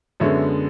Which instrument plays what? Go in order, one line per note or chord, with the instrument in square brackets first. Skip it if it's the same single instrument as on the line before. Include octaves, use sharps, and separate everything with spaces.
[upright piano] F#2 D3 G#3 B3 C#5 E5